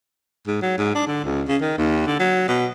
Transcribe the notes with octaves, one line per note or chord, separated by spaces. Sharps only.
G#2
F#3
G#2
D4
D3
C#2
C#3
D#3
D#2
D3
F#3
B2